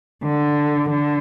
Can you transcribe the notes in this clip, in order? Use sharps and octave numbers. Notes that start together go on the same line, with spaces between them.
D3
D3